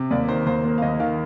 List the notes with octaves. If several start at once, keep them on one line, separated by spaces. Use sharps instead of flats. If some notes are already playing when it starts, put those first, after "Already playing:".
Already playing: C3
D#2 D5
D#3 C5
D#2 C5
A#3 C5
F5
D#2 D#5
D#3 F5